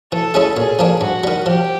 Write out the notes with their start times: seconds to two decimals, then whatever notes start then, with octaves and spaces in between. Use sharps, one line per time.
0.12 E3 A4
0.34 G#3 C#4 E4 G#4
0.57 A#2 G#4
0.79 F3 A#3 D4
1.01 G2 F#4
1.24 D#3 G3
1.46 F3 G4